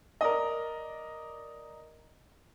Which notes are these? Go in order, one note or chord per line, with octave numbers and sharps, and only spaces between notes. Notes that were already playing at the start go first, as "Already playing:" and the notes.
A#4 D5 D#5